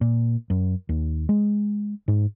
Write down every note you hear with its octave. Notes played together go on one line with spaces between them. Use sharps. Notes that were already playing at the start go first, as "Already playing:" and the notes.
A#2
F#2
D#2
G#3
G#2